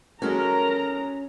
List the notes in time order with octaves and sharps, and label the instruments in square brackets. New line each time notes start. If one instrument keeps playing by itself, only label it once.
[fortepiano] F#3 G#3 [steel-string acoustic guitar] C#4 A4 [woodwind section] A#4 [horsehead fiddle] A#5